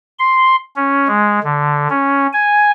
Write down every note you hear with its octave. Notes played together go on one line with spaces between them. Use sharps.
C6
C#4
G#3
D3
C#4
G#5